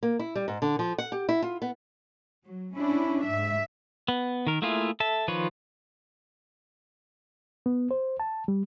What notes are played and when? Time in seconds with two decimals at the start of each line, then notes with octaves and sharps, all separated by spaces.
0.03 A#3
0.19 E4
0.35 G3
0.48 G#2
0.62 D3
0.79 F3
0.98 F#5
1.12 G4
1.29 E4
1.42 F4
1.62 B3
2.46 F#3
2.76 C#4 D4 E4
3.24 G#2 E5
4.08 B3
4.47 D#3 A#4
4.62 A3 A#3 E4 F4 G#4
5.00 A4 E5 A5
5.28 D#3 F3 F4 B4 C#5
7.66 B3
7.91 C5
8.20 A5
8.48 G3